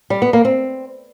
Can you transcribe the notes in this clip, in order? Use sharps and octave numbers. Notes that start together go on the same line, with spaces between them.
G3
B3
A#3
C4